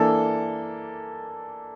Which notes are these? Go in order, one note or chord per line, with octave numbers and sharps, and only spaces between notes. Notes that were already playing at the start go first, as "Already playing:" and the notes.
Already playing: E3 A#3 D4 A4